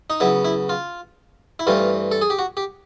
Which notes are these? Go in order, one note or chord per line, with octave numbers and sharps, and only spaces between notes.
D#4
C#3 F#3 B3 E4
E4
F4
E4
G2 E3 A3 C4 F4
A4
G#4
G4
F#4
G4